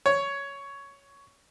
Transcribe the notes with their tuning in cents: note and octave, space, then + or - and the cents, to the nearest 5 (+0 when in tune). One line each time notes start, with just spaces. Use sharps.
C#5 +10